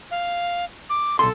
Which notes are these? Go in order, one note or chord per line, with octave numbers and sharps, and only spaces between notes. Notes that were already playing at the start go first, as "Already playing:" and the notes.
F5
D6
B1 A4 C6